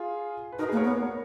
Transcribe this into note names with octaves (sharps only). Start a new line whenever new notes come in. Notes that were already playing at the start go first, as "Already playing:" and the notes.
Already playing: F4 G#4
B4
D#4 F#4 A#4
G#4 B4
A#3
A#4 C#5
B3
C#5
A#4 C#5